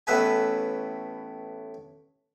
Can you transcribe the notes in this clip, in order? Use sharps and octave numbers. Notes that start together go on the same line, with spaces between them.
A1 A2 B3 B4 E5 G#5